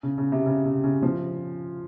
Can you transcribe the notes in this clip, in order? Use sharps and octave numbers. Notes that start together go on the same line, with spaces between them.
C#3
C#3
C3
C#3
C3
C#3
F3